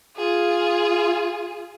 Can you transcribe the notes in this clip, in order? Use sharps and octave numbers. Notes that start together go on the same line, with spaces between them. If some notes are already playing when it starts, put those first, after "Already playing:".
F4 G#4